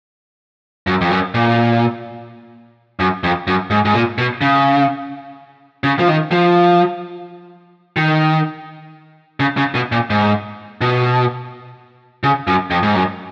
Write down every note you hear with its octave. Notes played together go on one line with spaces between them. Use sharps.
F#2
F2
F#2
A#2
F#2
F2
F#2
G#2
G#2
A#2
B2
C#3
C#3
F3
D#3
F3
D#3
C#3
C#3
B2
A#2
G#2
B2
C#3
F#2
F2
G#2
F#2